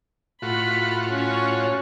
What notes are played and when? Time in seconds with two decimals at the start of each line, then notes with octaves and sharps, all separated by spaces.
0.42 A2 F4 F#4 B5
1.09 C#4 C#5